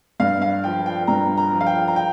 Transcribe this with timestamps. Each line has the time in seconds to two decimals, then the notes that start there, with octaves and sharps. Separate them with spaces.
0.20 G2 F5
0.42 F5
0.64 F3 G5
0.86 G5
1.07 G2 A#5
1.37 A#5
1.52 F3
1.61 F5
1.66 G5
1.88 A#5
1.96 G5